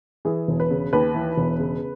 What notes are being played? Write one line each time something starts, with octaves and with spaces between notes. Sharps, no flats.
E3 G#4
E1
B4
C#3
D#2 B4
E3
E1
C#3